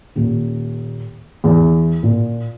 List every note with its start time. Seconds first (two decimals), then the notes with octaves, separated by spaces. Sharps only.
0.16 D#1
1.44 E2
2.03 A#2